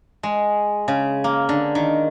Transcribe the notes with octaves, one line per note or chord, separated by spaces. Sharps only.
G#3
C#3
A#3
D3
D#3